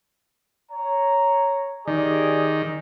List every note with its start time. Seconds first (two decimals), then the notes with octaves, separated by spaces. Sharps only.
0.72 C#5 A#5
1.87 D#3 G4 G#4 D5